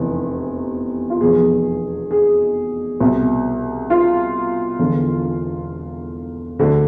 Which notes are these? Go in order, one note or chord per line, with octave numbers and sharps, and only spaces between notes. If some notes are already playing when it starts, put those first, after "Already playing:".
Already playing: F1 E2 C3 E3
F4
F1 E2 B2 G#4
G#4
C2 B2
F4
E1 E2 D3
D2 D3